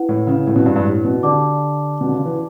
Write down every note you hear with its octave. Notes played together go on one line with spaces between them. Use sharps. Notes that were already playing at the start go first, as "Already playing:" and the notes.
Already playing: E4 B4 F#5
A2
C#3
A2
B2
G2
G2
A2
B2
D3 G4 D5 A5 D6
B2
D3
C#3
E3